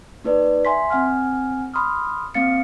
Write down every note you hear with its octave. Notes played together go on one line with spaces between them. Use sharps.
A#3 D#4 B4 D5
E5 G#5 C6 B6
C4 F#5 G#5 F6
B5 C6 D#6 F6
A#3 C4 F5 A6 C#7